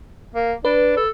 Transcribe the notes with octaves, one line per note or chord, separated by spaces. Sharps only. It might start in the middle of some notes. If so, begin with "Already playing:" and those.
A#3
D4 B4
A4